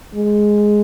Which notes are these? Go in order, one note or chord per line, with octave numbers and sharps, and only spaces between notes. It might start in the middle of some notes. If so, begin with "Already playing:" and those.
G#3